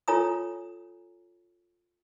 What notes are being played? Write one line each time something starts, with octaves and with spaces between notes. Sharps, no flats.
F4 A4 C#5 G#5 A#5 D#6